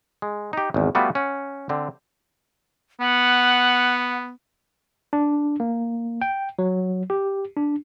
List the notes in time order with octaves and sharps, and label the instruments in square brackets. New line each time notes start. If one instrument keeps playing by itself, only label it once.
[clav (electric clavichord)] G#3
D#4 G4
G#1 E2
G3 A3 B3 F4 F#4
C#4 F#5
D3 C4
[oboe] B3 [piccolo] F#5
[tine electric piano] D4
A#3
G5
F#3
G4
D4